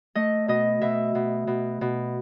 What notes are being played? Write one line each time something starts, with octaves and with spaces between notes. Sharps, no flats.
A3 D#5
B2 D#5
B2 E5
B2
B2
B2